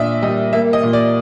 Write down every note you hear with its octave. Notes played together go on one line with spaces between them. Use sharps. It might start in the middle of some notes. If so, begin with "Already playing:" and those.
Already playing: A#2 D4 D#5 E5
G3 D#5
A#3 E5
D#5
A#2
D5